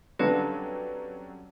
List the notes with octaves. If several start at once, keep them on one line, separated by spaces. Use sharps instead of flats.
D3 F#3 G3 C4 C#4 B4 A#6